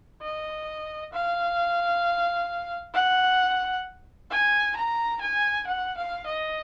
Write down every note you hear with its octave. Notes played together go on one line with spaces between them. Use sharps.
D#5
F5
F#5
G#5
A#5
G#5
F#5
F5
D#5